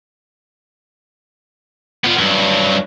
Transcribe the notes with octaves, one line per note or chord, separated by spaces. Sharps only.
B3 F4
G2 F#3